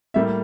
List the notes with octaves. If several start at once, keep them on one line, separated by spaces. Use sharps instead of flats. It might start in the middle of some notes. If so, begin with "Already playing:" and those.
A2 G3 A#3 E5